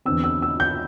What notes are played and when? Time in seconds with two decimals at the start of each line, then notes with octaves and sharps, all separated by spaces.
0.05 E2 D3 C4 E6
0.24 E6
0.42 E6
0.60 G6